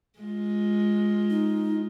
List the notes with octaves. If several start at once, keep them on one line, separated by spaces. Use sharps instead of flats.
G#3 F4
D#4